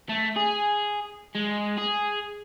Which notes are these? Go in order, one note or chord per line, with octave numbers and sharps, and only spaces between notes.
A3
G#4
G#3
G#4